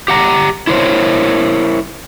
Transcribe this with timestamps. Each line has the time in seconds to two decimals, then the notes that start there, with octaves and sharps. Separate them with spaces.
0.08 G4 F#5 A#5
0.67 E4 A#4 C5 C#5